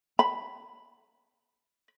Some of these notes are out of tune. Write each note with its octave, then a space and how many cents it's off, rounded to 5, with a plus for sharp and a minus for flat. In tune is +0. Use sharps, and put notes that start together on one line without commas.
B5 +0